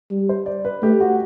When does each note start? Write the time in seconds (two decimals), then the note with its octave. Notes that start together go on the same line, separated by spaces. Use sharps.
0.11 G3
0.29 C5
0.46 D5
0.65 B4
0.82 A3 G4
1.01 F#4